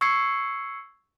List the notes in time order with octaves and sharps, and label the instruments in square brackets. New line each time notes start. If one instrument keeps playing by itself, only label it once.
[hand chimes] C#6 E6 G#6 C7 C#7